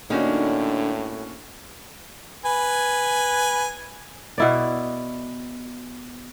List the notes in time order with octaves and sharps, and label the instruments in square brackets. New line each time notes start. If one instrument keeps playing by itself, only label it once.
[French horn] A2 [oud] D3 D#4 G4 [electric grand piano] A#3 C#4 F#4
[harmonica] B4 G#5
[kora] B2 E4 D5